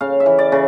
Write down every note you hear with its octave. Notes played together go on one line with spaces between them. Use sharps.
C#3 F5
E5
E3
D5
C#3